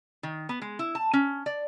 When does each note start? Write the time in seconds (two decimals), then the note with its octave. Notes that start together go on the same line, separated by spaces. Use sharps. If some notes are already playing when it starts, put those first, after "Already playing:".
0.23 D#3
0.49 B3
0.62 G#3
0.79 E4
0.95 A5
1.13 C#4
1.46 D5